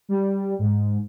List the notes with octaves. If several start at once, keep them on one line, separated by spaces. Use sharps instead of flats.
G3
G#2